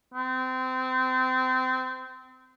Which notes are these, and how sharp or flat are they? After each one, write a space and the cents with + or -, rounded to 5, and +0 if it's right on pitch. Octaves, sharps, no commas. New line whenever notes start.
C4 -25